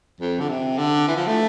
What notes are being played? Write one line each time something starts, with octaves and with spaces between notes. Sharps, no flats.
F2
D3
C3
D3
E3
F3
A3